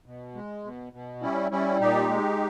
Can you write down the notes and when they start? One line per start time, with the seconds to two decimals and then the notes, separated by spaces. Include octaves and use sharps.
0.06 B2
0.35 G#3
0.64 B2
0.93 B2
1.22 G3 C#4 E4
1.51 G3 C#4 E4
1.80 A#2 D#4 G4
2.09 G#3